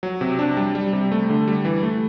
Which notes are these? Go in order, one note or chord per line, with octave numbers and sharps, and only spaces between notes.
F#3
C3
D4
G3
G3
C3
A3
D3
G3
E3
A3